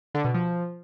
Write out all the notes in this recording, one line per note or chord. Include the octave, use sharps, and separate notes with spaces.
D3
B2
F3